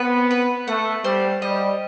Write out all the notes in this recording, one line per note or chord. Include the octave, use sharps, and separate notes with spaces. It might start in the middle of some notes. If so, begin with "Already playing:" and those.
Already playing: B3 C4 B4
B4
A3 F#5
G3 C5
G3 D#5